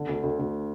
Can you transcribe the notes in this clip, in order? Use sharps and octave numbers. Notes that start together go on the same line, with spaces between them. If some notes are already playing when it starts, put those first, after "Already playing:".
Already playing: D3
D2
D2
D2